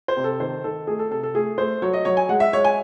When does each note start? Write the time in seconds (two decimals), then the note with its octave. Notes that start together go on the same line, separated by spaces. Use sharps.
0.08 C5
0.17 C3
0.24 A4
0.40 D#3 C5
0.64 D#3 A4
0.87 A3 G#4
0.99 A4
1.11 C3 A4
1.23 A4
1.34 A3 G#4
1.58 A3 C5
1.82 F#3 C#5
1.93 D#5
2.05 F#3 C#5
2.17 G#5
2.29 G#3 F#5
2.40 E5
2.53 G#3 C#5
2.64 G#5